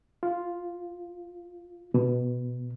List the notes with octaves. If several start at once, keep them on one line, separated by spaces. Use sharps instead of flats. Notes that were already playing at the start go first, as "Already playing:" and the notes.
F4
B2